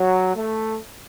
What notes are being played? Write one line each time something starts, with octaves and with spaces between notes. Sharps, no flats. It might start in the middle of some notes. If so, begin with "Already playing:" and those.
Already playing: F#3
A3